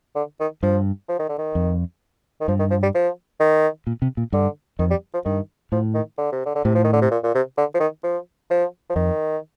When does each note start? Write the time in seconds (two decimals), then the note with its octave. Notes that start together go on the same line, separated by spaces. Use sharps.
0.16 D3
0.40 D#3
0.63 G2 F3
1.08 F3
1.19 D#3
1.29 D3
1.38 D#3
1.55 F2
2.41 D#3
2.48 G2 F3
2.59 D#3
2.70 F3
2.83 G3
2.95 F3
3.40 D#3
3.87 A#2
4.02 C3
4.17 A#2
4.32 G2 D3
4.79 F2 D#3
4.91 G3
5.14 F3
5.25 G2 D#3
5.72 A2 F3
5.94 D#3
6.18 D3
6.32 C3
6.45 D3
6.55 D3
6.65 A2 C3
6.75 F3
6.84 D#3
6.93 D3
7.02 C3
7.11 A#2
7.24 A#2
7.35 C3
7.57 D3
7.74 F3
7.80 D#3
8.04 F3
8.50 F3
8.90 F3
8.95 F2 D#3